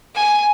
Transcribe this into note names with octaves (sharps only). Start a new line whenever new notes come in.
G#5